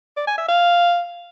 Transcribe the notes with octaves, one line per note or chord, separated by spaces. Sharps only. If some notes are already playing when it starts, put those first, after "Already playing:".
D5
G#5
E5
F5